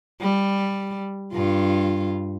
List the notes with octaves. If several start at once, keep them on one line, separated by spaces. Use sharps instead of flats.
G3
G2 F4